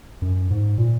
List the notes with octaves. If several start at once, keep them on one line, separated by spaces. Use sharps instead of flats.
F#2
G#2
A#2